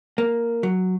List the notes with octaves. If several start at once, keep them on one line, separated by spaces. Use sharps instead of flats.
A#3
F#3